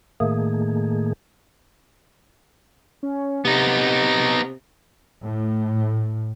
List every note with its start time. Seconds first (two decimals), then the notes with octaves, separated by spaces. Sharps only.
0.20 A2 D#3 A3 A#3 G#4
3.03 C#4
3.45 C3 B3 D#4
5.23 A2